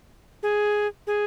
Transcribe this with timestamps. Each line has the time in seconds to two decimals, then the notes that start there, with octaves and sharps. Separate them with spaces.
0.43 G#4
1.07 G#4